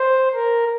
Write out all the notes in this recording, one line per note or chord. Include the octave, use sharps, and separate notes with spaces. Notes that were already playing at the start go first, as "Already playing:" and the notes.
Already playing: C5
A#4